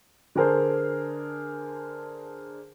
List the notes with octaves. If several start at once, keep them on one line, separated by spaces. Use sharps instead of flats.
D3 D4 G#4 A#4 C5